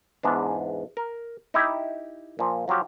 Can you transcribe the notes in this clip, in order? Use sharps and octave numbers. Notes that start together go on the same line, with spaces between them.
E2 G#2 B3 D4
A#4
D#4 E4 G4
A#2 F3
F3 F#3 F4 G4